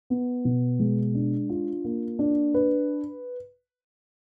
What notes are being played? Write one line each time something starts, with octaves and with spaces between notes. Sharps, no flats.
B3
B2
G#3
D4
F4
A#3
D4
B4